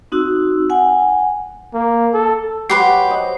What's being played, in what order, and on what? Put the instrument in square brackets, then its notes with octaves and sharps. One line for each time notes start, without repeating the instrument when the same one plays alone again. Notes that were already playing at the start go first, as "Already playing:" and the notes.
[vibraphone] C4 D#4 F#4 E6
F#5 G#5
[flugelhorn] A#3
A4
[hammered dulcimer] F#3 [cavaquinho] G4 B4 C6 [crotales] C7
[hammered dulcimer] C5 D#5